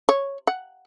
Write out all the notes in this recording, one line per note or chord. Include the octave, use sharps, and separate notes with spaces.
C#5
F#5